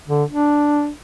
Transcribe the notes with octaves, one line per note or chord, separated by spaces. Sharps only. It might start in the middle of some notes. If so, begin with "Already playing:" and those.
D3
D4